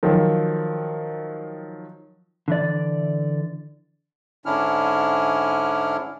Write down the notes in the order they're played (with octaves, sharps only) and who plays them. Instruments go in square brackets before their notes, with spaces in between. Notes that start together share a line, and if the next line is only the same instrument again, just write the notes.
[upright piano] D#3 F3 F#3
[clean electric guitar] D3 E3 D5
[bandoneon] G#2 D3 C#4 D4 E4 F6